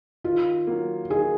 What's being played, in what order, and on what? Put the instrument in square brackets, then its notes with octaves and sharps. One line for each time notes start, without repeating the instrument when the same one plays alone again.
[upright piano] D#3 [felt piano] F4
[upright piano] F#3 A#3
[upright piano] D#3 [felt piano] G#4